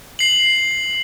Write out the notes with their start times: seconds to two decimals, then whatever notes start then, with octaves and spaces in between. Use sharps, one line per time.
0.19 C7 F#7